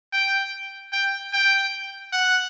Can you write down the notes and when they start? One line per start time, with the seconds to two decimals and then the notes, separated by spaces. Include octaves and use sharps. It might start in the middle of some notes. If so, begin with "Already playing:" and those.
0.13 G5
0.92 G5
1.33 G5
2.13 F#5